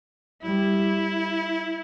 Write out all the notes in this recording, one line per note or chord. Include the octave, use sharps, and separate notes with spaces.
G3 E4